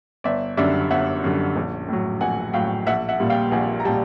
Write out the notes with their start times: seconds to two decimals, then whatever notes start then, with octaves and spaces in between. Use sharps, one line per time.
0.24 G1 D5 E5
0.57 F#2 D3 G3 D5 E5
0.90 G1 E5 F#5
1.24 F#2 D3 G3
1.56 A#1
1.88 A2 F#3
2.21 A#1 F#5 G#5
2.53 A2 F#3 F5 G5
2.86 A#1 E5 F#5
3.09 E5 F#5
3.20 A#2 G3
3.30 F5 G5
3.52 A#1 F#5 G#5
3.80 A#5
3.85 A#2 G3 G5 A5